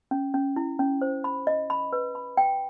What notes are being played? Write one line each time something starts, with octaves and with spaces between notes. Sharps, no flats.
C#4
C#4
E4
C#4
C5
B5
D#5
B5
B4
B5
G5